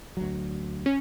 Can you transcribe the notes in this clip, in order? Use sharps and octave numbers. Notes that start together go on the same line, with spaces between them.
D2 F#3
C#4